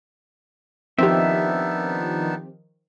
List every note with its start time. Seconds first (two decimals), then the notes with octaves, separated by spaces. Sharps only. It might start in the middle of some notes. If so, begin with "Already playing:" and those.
0.99 D#3 F3 B3 C4 D4 D#4 G4 E5